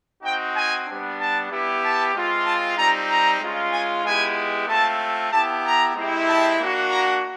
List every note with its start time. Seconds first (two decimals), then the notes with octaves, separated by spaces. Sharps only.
0.23 C4 D#4 F#4 G5
0.54 G#5
0.86 G3 B3 D4
1.18 A5
1.50 B3 E4 G4
1.82 A5
2.13 G#3 C4 F4
2.45 A5
2.77 G3 C4 D#4 A#5
3.09 A#5
3.41 G#3 C#4 F4
3.72 G#5
4.04 G#3 B3 E4 G4 G#5
4.68 A3 C4 F4 A5
5.32 B3 E4 G4 A5
5.64 A#5
5.96 G#3 C4 E4 G4
6.28 A5
6.59 A#3 D4 F#4
6.91 A#5